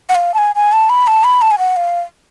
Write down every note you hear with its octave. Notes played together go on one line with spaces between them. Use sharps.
F#5
F5
A5
G#5
G#5
A5
B5
A5
B5
A5
G#5
F#5
F5